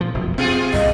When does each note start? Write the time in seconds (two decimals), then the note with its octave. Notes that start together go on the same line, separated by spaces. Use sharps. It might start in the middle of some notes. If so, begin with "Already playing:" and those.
0.01 A#2 F3
0.14 F1 F#2 B2
0.38 B2 C4 F4 G#4
0.73 C2 G2 A#2 D#5